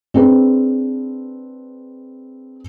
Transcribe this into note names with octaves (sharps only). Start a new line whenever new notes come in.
C4 D4 G#4 B4